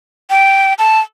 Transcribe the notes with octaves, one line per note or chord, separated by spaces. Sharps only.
G5
A5